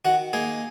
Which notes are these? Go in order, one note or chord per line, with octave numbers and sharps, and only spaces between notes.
D#3 F#4 F#5
A#3 D#4 G#4 G#5